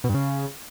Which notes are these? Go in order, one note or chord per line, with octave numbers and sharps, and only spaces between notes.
B2
G2
C#3